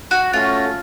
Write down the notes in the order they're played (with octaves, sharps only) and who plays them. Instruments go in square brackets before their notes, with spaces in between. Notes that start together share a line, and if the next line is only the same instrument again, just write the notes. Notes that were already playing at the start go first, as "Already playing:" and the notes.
[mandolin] F#4
[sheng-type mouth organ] A3 C#4 F#4 [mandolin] F4